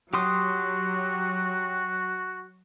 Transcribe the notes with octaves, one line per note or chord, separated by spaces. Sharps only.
F#3 F#4 G4 C6 D#6